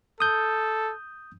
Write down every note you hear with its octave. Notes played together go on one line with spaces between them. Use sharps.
A4 D#6 G6